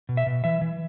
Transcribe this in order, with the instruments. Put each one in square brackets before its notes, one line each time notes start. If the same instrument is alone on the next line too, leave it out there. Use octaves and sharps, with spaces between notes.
[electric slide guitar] B2
E5
B2
E3 E5
E3